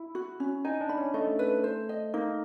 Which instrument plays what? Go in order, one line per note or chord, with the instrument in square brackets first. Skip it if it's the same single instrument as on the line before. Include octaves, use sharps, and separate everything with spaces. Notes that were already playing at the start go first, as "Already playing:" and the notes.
Already playing: [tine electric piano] E4
[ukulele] F#4
C#4
[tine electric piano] D#4 [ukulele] G#5
[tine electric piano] D4
[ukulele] B5
[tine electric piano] C#4
[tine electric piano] A3 [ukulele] D#5
[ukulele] B4
C5
D#5
[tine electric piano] A#3 [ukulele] D#4